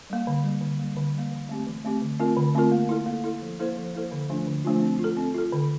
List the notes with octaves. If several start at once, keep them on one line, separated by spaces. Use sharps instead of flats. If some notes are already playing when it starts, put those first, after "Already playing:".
G3 A#3
D3
G3 A#3
D3
G3 A#3
D3
G3 A#3
E3
A3 C4 G4
E3
A3 C4 G4
D3
A3 C4 F4 A#4
D3
A3 C4 F4 A#4
A#3
E4 A4
A#3
E4 A4
F3
A#3 E4 A4 C5
F3
A#3 E4 A4 C5
D3
F3 A3 D4 F4
D3
F3 A3 D4 F4
C4
F4
A4
C4
F4 A4
D3